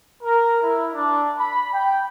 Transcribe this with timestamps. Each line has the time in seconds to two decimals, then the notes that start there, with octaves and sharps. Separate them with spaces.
0.23 A#4
0.63 E4
0.93 D4
1.39 B5
1.74 G5